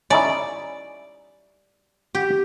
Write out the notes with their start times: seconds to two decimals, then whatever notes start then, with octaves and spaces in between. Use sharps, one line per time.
0.10 C#4 D#4 E4 D5
2.15 G4